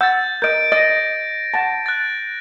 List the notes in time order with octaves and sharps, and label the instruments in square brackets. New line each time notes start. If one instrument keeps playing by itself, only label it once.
[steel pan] F#5 E6 [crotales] G6 A6
[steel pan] A#4 D#5 [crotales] G6 D7
[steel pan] D#5 [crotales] A6 A#6
[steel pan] F#5 A5
[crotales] F#6 A6